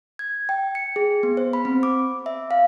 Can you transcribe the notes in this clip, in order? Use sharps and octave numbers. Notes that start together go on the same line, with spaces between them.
G#6
G5
C#7
G#4
B3
C5
B5
C4
D6
E5
F5